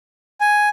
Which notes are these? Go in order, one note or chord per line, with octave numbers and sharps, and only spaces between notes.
G#5